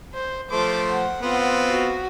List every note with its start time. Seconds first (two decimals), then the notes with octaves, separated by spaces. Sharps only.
0.14 C5
0.51 F3 A3 C5 D6
0.92 F#5
1.22 B3 C4 F4
1.70 F#4